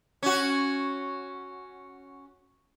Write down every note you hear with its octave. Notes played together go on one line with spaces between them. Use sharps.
C#4 F#4